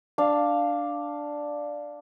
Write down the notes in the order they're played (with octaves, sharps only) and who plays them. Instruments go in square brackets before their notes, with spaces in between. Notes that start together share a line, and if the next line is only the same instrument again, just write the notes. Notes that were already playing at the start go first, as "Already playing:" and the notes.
[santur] D4 F5